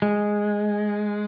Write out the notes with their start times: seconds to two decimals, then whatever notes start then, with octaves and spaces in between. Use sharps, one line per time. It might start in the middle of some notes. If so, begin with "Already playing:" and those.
0.02 G#3